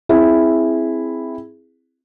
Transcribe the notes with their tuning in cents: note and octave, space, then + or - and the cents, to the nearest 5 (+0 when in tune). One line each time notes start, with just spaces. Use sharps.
C4 +0 E4 +0 G#4 +0